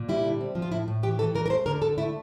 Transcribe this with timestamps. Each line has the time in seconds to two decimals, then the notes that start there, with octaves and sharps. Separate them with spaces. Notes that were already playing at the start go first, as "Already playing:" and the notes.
Already playing: A#2
0.09 G3 E4
0.24 D3
0.41 C4
0.55 F3
0.62 F4
0.72 A2 E4
0.88 A2
1.03 E3 G4
1.19 E3 A4
1.35 E3 A#4
1.46 A#4
1.50 A3 C5
1.66 D3 A#4
1.82 D3 A4
1.98 A3 E4